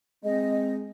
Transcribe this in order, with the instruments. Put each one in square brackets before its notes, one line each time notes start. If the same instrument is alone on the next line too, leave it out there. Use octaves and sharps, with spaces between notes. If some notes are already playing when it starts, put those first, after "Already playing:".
[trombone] G#3 [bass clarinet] C4 [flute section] D#5